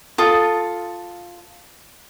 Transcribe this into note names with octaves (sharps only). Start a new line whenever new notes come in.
F4 A4 D#6